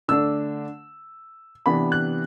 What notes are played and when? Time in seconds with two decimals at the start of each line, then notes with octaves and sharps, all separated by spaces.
0.08 D3 A3 D4 E6
1.66 C3 E3 B3 D4 B5
1.92 F#6